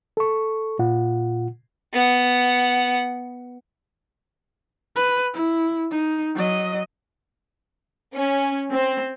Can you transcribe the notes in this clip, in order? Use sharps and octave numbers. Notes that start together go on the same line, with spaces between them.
A4 C#6
A#2 F4 F#5
B3 F#5
B4
E4
D#4
F#3 D#5
C#4
C4